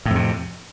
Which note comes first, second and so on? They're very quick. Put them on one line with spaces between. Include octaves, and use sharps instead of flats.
A2 F2 C3